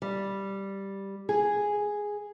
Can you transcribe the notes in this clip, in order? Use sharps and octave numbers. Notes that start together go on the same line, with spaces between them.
G3
G#4